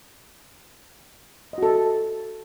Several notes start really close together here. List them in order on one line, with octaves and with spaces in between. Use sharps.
D#5 F#4 A4